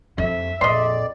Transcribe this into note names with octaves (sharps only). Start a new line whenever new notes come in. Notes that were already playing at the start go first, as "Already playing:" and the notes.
F2 E5
A#1 F2 D5 D#5 C6